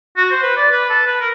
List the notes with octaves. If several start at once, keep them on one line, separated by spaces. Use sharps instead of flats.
F#4
C5
B4
D5
B4
A4
B4
A#4